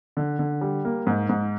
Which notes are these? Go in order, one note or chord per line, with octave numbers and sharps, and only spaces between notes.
D3
D3
G3
A#3
G#2
G#2